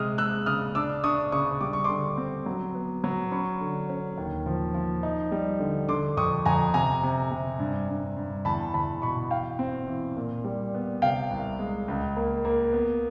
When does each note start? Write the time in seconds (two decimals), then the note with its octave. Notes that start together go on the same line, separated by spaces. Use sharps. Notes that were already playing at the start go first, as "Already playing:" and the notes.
Already playing: C3 G#3 D#6 F6
0.18 G#3 E6 F#6
0.46 C#3 D#6 F6
0.75 D4 D6 E6
1.04 D4 C#6 D#6
1.32 C#3 C#6 D#6
1.61 G3 D6
1.73 C#6
1.84 D3 C6 D6
2.18 C4
2.46 F#3
2.75 B3
3.04 F#3
3.32 C#4 B5 C#6
3.61 D3
3.89 C#4
4.18 D#2
4.46 F3
4.74 F3
5.03 D#4
5.32 G3
5.60 D3
5.88 D3 C6 D6
6.17 F2 C#6 D#6
6.46 F2 G#5 A#5
6.74 C3 G#5 A#5
7.03 C3
7.31 C3
7.59 G2
7.89 G2
8.17 G2
8.45 E2 A5 B5
8.74 E2 A5 B5
9.02 B2 B5 C#6
9.31 E3 F5 G5
9.59 C4
9.88 E3
10.17 A#2
10.44 G3
10.74 B3
11.02 C3 F5 G5
11.31 C2
11.59 G#3
11.88 C#2
12.16 A#3
12.45 A#3
12.73 B3